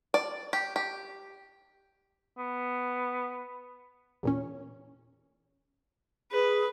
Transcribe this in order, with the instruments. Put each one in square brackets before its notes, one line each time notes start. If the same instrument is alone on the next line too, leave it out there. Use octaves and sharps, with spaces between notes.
[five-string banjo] D5
G4
G4
[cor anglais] B3
[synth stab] E2 A#2 C#4
[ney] G#4 [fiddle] B4